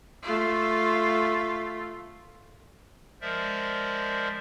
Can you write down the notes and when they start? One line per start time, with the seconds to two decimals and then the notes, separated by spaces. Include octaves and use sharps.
0.23 A3 F4
3.21 F3 G#3 A#4 C5 D5 E5